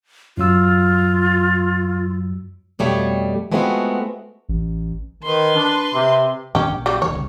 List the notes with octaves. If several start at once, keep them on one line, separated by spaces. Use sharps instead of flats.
F#2 F#3 F4 E6
F2 B2 G3 A3 C#5
G#3 A3 B3 C4 F4 F#4
A1
D#3 B4 C6
D4
C3
G2 D#3 C#4 D4 G4
A#1
C#3 F#3 G3
D#1 D#3 C#5
C2 C#3